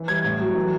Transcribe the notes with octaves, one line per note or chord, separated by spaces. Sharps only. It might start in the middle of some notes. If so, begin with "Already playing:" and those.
Already playing: E3
G3 G#6
A2
F#3
E3